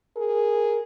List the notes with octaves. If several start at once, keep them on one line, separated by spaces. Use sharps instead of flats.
G#4 A#4